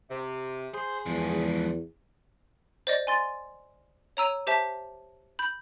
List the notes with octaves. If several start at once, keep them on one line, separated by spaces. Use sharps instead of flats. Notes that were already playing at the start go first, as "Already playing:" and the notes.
C3
G#4 C5
E2 F3 G#3
C5 D5 D#5
G#5 C6 A6
C#5 A#5 E6 D#7
G4 C5 E5 A5 B6
B5 G6